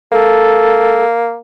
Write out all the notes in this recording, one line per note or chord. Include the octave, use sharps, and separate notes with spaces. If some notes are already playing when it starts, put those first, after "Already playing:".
A#3 A4